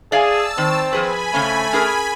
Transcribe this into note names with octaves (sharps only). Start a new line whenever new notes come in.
G#4 D5 F5 G#5 A5 E6
D#3 C4
F3 G#4 B4 G#5 B5
C#3 A3 C4 C#4
C#4 G#4 A#4